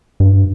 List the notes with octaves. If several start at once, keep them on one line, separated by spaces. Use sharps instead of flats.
G2